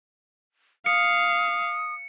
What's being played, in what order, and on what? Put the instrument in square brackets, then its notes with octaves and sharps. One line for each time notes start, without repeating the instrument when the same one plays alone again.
[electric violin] F5 [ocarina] D#6 [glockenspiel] C#7